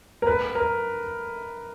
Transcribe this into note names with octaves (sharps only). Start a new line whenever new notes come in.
A#4
B4
A#4